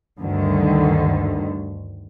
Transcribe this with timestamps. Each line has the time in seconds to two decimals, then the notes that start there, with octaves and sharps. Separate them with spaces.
0.20 D2 G2 D3 D#3